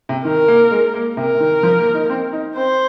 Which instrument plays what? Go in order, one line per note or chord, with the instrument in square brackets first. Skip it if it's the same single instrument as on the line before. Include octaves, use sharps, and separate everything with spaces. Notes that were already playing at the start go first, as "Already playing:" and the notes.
[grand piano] C3
[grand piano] D#3 [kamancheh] A#4
[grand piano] A#3
G#3
A#3
[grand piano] C3 [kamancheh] A#4
[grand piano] C3
D#3
F3
A#3
D#4
A#3
C4
D#4
[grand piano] C4 [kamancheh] C5